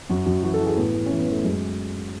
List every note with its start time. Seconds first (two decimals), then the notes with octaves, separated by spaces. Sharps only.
0.10 F#2 F#4
0.26 F#2
0.43 E3 F#4
0.54 A4
0.60 E3
0.66 G#4
0.76 A2 B3
0.94 A2
1.06 E3 C#4
1.19 B3
1.28 E3 A3
1.44 F#2 G#3